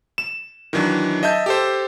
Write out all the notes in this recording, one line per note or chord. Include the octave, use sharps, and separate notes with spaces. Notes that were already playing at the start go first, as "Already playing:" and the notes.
E7
D#3 E3 F#3 D4
D#5 E5 A5 G6
G4 A4 C5